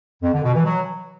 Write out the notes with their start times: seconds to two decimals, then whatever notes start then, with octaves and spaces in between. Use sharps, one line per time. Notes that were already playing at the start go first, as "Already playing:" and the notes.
0.22 F2
0.33 D3
0.43 B2
0.54 E3
0.64 F#3